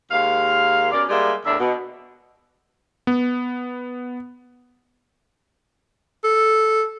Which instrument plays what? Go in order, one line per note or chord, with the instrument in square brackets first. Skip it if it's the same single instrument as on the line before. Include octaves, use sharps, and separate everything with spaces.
[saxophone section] D#2 G#3 A#3 F5
B2 C#4 A#4 D5
G3 G#3 A#3 D#4 D5 E5
E2 A2 D4 A#4 E5
B2
[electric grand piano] B3
[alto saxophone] A4